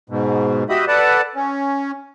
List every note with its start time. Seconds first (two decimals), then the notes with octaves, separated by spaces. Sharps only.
0.10 G#2 B2
0.69 F#4 G4 D#5 E5 B5 D#6
0.88 A4 B4 D5 F#5 A5
1.35 C#4